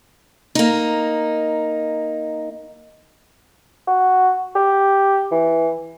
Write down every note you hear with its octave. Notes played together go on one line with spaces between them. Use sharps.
A#3 D#4
F#4
G4
E3